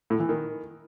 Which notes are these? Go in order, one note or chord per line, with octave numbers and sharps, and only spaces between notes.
A2
E3
D#3